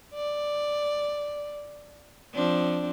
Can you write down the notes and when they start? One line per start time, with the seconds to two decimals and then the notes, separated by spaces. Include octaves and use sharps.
0.14 D5
2.34 F3 C4 D4